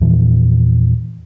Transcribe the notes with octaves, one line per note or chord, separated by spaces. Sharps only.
E2 A#2 E3 F3